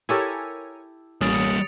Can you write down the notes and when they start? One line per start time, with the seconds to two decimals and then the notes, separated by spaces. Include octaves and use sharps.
0.09 E4 G4 A4 A#4 C#5 G#5
1.21 A1 G3 A#3 C#4 D#6 A6 D7
1.33 D#6 C#7